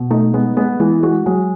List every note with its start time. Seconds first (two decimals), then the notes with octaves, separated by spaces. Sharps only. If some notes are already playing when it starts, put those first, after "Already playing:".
Already playing: B2
0.10 A3 D#4
0.34 G#3 B3
0.57 G#3 B3
0.80 E3 G#3
1.03 G#3 F#4
1.26 F#3 G#3